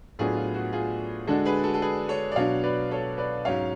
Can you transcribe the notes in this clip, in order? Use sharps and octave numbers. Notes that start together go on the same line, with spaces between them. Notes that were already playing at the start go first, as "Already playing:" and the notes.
A2 F#3 B3 D4 F4 G#4
F4
F#4
F4 G#4
D3 G#3 D4 F#4 A4
G#4 B4
F#4 A4
A4
G#4 B4
A4 C#5
D5
B2 F#3 B3 D4 C#5 F5
B4 D5
A4 C#5
B4 D5
G#2 F#3 C#4 C#5 F5